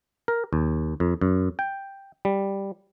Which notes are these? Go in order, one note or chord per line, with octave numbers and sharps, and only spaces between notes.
A#4
D#2
F2
F#2
G5
G3